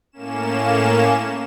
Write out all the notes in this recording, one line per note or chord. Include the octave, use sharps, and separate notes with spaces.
A2 A#3 C#4 E7